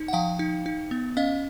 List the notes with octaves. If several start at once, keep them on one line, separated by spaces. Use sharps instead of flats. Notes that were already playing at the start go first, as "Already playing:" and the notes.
Already playing: D#4
F#5
F3 F5 G5
D#4
D#4
B3
C#4 D#5 F5